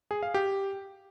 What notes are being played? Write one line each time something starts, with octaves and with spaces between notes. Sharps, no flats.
G#4
F5
G4